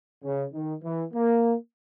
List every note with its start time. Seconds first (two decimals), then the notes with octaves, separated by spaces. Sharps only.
0.24 C#3
0.54 D#3
0.83 E3
1.13 A#3